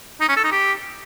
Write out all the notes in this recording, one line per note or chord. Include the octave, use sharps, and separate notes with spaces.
D#4
C#4
A4
D#4
G4